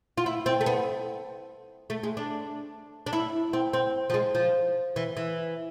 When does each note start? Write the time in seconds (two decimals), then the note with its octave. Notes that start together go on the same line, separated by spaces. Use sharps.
0.17 F4
0.26 E4
0.46 C4
0.61 A3
0.66 B3
1.90 A3
2.03 G#3
2.17 D4
3.06 D4
3.13 E4
3.53 C4
3.73 C4
4.10 F3
4.14 G#3
4.35 F3
4.96 E3
5.17 E3